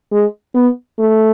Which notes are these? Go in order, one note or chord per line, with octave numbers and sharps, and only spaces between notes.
G#3
B3
A3